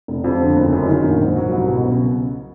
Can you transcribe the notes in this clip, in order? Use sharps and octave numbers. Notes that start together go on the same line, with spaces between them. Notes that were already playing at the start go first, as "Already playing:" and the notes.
F1
F2
D3
F#1
F#2
D#3
A#1
G#2
F#3
C2
B2
C#3